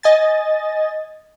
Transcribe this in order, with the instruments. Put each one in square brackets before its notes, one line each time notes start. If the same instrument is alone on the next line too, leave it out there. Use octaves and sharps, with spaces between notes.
[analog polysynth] D#5 G#5 A6